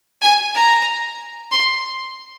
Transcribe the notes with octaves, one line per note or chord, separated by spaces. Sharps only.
G#5
A#5
C6